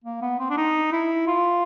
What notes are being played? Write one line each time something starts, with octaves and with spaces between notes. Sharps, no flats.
A#3
B3
C4
D4
D#4
E4
F4